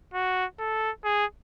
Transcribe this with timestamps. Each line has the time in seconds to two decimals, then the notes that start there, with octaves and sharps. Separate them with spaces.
0.14 F#4
0.59 A4
1.04 G#4